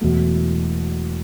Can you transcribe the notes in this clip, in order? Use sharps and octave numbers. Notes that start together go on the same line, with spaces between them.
E1 E2 B2 F#3 A3